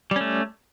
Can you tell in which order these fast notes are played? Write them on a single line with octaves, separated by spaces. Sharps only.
G3 C#4 A3